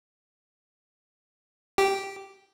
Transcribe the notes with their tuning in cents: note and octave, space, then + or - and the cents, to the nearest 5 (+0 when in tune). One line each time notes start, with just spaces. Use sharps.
G4 -5